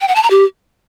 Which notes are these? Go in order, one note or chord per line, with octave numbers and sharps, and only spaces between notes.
G5
F#5
A5
A#5
G4